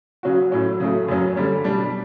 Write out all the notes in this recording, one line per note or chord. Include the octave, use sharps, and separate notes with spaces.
C#3 F#3 C#4 F#4
A2 F#3 C#4
C#3 F#3 A3
F#2 C#3 F#3 C#4
D3 G3 C#4
B2 G3 D4